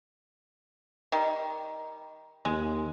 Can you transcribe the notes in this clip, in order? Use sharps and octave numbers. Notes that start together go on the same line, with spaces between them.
D#3 G3
D#2 G#3